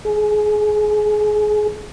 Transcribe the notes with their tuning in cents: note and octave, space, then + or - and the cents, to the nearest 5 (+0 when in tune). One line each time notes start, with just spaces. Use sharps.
G#4 +25